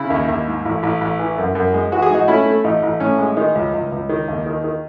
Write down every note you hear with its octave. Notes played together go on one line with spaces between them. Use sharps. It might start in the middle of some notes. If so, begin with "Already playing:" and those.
Already playing: C#3 E4
D#2
D#2
G#2
A1
A1
A1
E3
F#2
F#2
G#3
E3 F#4
G#4
G#2 D#4 F#4
A3 C#4 E4
A3
A1 D#4
A1
A2 C#4
G#3
D#3 D#4
C#2
C#2
C#2
D#3
D#2
D#3
D#3